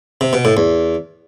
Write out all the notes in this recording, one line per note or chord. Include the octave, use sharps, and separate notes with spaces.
C3
B2
A2
E2